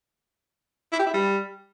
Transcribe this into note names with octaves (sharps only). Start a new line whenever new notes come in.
E4
G4
E4
G3